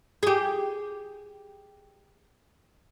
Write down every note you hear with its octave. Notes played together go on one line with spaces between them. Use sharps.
G4 G#4